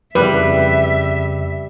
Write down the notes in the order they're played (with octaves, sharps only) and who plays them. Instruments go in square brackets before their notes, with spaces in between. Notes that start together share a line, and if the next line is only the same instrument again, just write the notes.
[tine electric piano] F2 C#3 [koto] G3 [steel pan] B4 [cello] E5